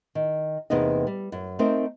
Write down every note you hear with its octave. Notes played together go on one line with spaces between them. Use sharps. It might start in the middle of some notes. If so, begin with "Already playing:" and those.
D#3
E2 C3 A#3 B3 D#4 D#5
G3
F#2
A3 C4 D#4 A#4 C5